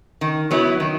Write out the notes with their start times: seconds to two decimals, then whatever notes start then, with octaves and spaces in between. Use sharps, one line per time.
0.21 D#3
0.51 F#3 B3 E4
0.80 D#3